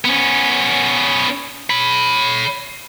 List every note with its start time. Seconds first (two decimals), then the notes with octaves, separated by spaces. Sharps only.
0.05 B3 C#4
1.70 C#5 B5